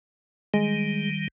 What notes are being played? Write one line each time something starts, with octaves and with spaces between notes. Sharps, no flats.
D#3 G3 G#3